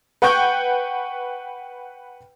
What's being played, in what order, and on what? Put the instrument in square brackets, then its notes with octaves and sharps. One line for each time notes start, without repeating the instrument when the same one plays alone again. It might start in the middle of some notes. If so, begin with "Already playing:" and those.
[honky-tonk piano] B4 F#5 G5 C#6 G6